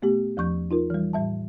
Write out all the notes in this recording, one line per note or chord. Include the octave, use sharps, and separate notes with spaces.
B2 A3 B3 G4
E2 F3 C#6 G6
D#4 F4 A#4
E3 G3
A2 G3 E5 A5